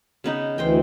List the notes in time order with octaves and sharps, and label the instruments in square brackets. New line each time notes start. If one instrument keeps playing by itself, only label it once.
[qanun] C#3 B3 D#4
[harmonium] D2 E3 [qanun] C5 D#5 G5